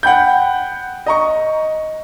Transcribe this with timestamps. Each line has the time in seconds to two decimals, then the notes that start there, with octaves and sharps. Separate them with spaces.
0.03 F#5 G5 B5 G6
1.06 D#5 A#5 C#6